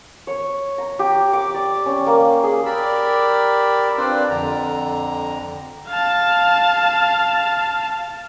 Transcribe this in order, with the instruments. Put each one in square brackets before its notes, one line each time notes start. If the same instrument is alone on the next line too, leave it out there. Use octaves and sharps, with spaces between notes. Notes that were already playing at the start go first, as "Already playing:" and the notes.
[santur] C#5
A#5
G4
D6
D5
C#4
A#3
G#4
[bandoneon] G4 A#4 D5 B5 E6
C4 D4 F4 B4 C5 D5
F2 D3 A#5
[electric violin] F5 A5